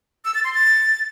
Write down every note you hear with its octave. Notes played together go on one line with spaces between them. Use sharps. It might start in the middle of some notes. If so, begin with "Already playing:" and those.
E6
A6
C6
A6